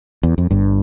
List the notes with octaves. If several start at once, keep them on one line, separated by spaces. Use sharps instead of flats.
E2
F2
G1 G2